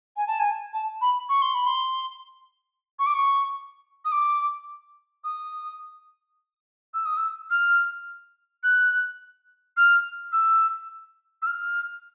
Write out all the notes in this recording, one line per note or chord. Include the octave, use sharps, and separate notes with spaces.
G#5
A5
G#5
A5
B5
C#6
C6
B5
C6
C#6
D6
C#6
D#6
D6
D#6
E6
D#6
E6
F6
F#6
F6
E6
E6
F6